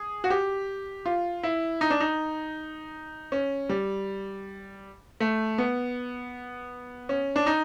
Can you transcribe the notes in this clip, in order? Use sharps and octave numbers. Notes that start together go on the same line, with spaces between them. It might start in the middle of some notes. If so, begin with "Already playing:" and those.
Already playing: G#4
F#4
G4
F4
E4
D#4
D4
D#4
C#4
G3
A3
B3
C#4
D4
D#4